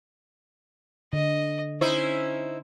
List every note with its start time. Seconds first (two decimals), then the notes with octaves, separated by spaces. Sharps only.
1.13 D3 D#5
1.81 C#4 D#4 E4 C5